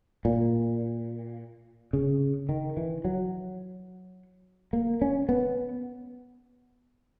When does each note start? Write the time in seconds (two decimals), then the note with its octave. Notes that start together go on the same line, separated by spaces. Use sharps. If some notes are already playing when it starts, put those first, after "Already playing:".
0.25 A#2
1.93 C#3
2.49 D#3
2.77 E3
3.05 F#3
4.73 A#3
5.02 C#4
5.29 B3